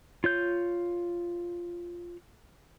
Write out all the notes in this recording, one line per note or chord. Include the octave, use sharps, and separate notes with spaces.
F4 C#5 G6